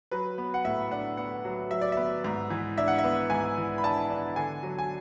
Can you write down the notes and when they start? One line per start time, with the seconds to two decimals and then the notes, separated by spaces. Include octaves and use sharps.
0.11 F#3 B4
0.38 B3
0.54 F#5
0.65 A2 E5
0.91 D4 F#5
1.17 B3 F#5
1.45 F#3
1.71 F#3 E5
1.81 D5
1.92 B3 E5
2.24 G#2
2.50 E3
2.77 D4 E5
2.88 F#5
2.98 E5
3.04 B3
3.30 G#2 G#5
3.57 E3
3.78 B5
3.83 D4 A5
4.10 D4
4.36 D3 G#5
4.63 F#3
4.78 G#5